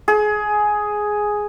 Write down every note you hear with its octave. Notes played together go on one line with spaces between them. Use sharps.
G#4